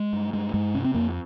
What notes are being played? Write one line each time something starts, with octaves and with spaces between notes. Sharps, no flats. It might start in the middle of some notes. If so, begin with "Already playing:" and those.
Already playing: G#3
G2
G2 G#3
G2 G#3
C3 C#4
C4
F2 A#3